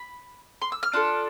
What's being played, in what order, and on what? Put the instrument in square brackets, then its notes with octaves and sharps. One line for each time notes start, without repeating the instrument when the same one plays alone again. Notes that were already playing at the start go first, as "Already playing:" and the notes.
Already playing: [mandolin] B5
C6
E6
F6
D4 F4 A4